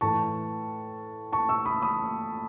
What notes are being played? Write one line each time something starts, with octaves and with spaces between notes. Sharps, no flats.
A2 E3 A5 C#6
A5 C#6
C#6 E6
B5 D#6
B5 D#6